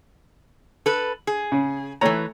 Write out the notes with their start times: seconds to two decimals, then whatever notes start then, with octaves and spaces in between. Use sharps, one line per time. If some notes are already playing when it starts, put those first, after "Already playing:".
0.86 A4 B4
1.27 G#4
1.52 C#3
2.01 E3 A3 B4 C#5 A#5